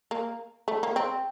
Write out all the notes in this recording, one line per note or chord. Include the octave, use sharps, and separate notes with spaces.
A#3
A3
A#3
C4